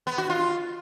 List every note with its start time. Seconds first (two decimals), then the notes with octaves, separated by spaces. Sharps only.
0.07 B3
0.18 F#4
0.30 F4